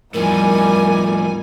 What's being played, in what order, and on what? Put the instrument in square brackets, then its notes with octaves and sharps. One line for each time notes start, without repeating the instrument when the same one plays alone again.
[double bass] E2 G3 [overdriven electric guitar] A2 F3 [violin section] D#4 G#5 [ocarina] A#4